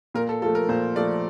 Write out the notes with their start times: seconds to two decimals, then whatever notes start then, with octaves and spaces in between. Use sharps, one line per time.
0.14 A#2 A#4
0.29 A4
0.42 F3 A3 A4
0.55 A#4
0.69 A#2 C5
0.96 F3 A3 D5